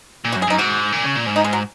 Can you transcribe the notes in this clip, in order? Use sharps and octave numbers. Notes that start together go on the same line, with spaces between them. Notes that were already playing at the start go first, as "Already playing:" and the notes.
A#2
F#4
F#2
G#4
F#2 D#4
G#2 F#4
A#2
C#3
A#2
G#2
D#4
G#3
F#3